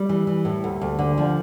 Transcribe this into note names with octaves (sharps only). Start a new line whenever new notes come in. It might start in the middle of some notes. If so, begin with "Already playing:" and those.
Already playing: G3
E3
E3
A2
D2
D2
D3
F3